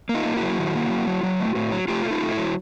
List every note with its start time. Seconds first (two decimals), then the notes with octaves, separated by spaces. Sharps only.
0.09 A#3
0.14 D#4 F4
0.25 A#3
0.37 E4 F#4
0.42 F#3
0.58 D#3
0.75 A#3
0.90 F#3
1.07 F#3
1.23 F#3
1.40 A3
1.55 A2
1.72 F#3
1.88 A3 F4 G4
2.05 A3
2.10 D#4 F4
2.22 A3
2.32 E4
2.37 F#3